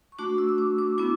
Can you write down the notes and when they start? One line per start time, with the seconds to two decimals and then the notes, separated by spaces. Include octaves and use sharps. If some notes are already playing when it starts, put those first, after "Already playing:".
0.12 C#6
0.18 A3 D4 F#4 D6
0.38 E6
0.49 E6
0.58 D6
0.78 D6
0.98 B3 E4 D6